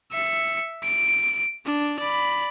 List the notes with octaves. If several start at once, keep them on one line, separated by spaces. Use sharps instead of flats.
E5 C#7
D7
D4
D5 B5